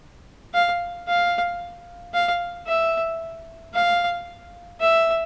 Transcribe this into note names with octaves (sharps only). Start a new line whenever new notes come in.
F5
F5
F5
E5
F5
E5